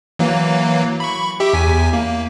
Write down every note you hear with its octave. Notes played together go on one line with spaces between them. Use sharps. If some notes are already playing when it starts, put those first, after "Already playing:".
E3 F#3 A#3
B5 C#6
G4 E5 G5
E2 G#5 B6
A#3